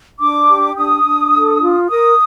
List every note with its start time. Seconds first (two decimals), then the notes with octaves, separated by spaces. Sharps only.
0.20 D4 D6
0.47 G4
0.76 D4 D#6
1.04 D4
1.33 A4
1.62 F4
1.89 A#4 D#6